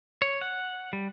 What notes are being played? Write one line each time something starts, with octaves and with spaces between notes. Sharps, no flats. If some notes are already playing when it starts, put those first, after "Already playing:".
C#5
F#5
G3